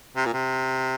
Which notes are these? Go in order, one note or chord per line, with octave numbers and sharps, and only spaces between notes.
C3
A#2
C3